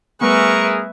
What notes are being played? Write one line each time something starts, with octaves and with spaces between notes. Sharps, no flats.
G3 A3 B3 G#4 A#4 B4 E5 C#6